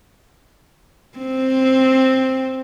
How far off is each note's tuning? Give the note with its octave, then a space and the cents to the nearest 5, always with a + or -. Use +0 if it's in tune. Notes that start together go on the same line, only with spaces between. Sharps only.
C4 +5